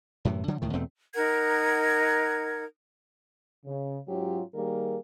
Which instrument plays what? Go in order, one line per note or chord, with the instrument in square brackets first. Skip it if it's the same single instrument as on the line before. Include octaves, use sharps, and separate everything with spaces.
[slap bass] F#2 A2 C3 E3
D3 F#3 G3
C#2 A2 D#3
E2 B2 A3 C4
[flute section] D#4 A#4 F#5 G#6
[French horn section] C#3
G#2 F#3 C#4 F4 G4
D#3 G3 A#3 G#4 A#4